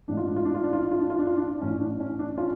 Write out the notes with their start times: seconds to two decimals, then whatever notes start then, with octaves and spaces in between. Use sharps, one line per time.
0.08 A1 G#2 D4
0.17 F4
0.27 D4
0.36 F4
0.45 D4
0.54 F4
0.63 D4
0.73 F4
0.82 D4
0.91 F4
1.01 D4
1.10 F4
1.19 D4
1.27 F4
1.37 D4
1.61 A1 A2 C#4
1.80 D4
2.00 C#4
2.19 D4
2.38 C#4 F4